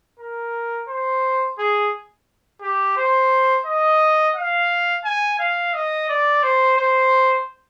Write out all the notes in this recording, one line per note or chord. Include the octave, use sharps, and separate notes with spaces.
A#4
C5
G#4
G4
C5
D#5
F5
G#5
F5
D#5
D5
C5
C5